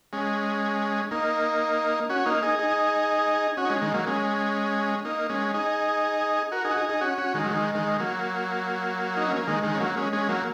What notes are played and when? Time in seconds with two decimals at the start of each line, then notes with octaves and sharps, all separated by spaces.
0.13 G#3 C#4
1.11 A#3 D#4
2.09 C#4 F#4
2.26 A#3 D#4
2.42 D#4 G#4
2.59 D#4 G#4
3.57 C#4 F#4
3.65 D#4
3.69 G#3 C#4
3.82 D#3 G#3
3.94 F#3 A#3
4.06 G#3 C#4
5.05 A#3 D#4
5.29 G#3 C#4
5.54 D#4 G#4
6.52 F#4 A#4
6.65 D#4 G#4
6.71 F#4
6.77 D#4 G#4
6.89 D#4 G#4
7.01 C#4 F#4
7.18 C#4 F#4
7.34 D#3 G#3
7.45 F#3
7.50 D#3 G#3
7.75 D#3 G#3
8.00 F#3 A#3
9.17 D#4
9.27 C#4
9.37 A#3
9.47 D#3 G#3
9.63 D#3 G#3
9.75 C#4
9.80 F#3 A#3
9.97 G#3 C#4
10.13 G#3 C#4
10.29 F#3 A#3